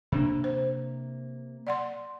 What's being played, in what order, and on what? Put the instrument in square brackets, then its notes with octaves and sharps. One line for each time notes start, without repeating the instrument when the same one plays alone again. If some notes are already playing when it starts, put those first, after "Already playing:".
[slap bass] C3 A#3 [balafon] D4
[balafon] C5
D5 F#5 C6